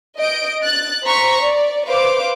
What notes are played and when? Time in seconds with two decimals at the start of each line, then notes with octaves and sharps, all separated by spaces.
0.19 D#5 G6 D7
0.62 F#6 A6
1.03 C5 A#5 C#6 B6
1.42 D5
1.87 B4 C5 F5 D6